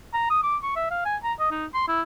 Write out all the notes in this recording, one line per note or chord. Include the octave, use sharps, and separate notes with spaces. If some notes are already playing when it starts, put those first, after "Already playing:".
A#5
D#6
D6
C#6
E5
F5
G#5
A#5
D#5
D#4
C6
E4